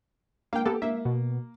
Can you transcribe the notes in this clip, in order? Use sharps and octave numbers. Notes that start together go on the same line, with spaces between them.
A#3 F5 G5
A#3 B3 G4 A4
A#3 E5
B2